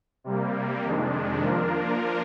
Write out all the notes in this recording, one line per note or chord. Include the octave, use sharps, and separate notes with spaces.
C3 G3 A#3
F2 C3 D#3 G#3 D4
F3 A#3 D4 F4 A#4